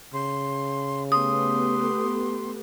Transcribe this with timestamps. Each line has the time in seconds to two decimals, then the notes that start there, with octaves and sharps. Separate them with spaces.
0.14 C#3 C6
1.12 A3 B3 G4 C6 D#6